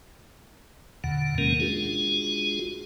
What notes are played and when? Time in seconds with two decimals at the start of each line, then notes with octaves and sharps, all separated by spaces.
1.04 E2 A#2 D3 F#5
1.38 C3 D#3 G#3 A#3 C#4 A#4
1.60 G#3 D4 F4 F#4 G#4